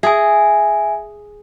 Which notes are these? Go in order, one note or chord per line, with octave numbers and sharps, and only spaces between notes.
G#4 E5 G#5